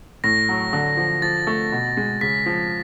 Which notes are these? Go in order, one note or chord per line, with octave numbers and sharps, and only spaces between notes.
A2 A#6
F#3
D3
F3
F3 A6
A3
B2
G#3
C#3 B6
F3